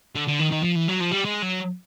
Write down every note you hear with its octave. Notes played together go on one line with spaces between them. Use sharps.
D3
D3
D#3
D#3
F3
E3
F#3
F3
G3
G#3
F#3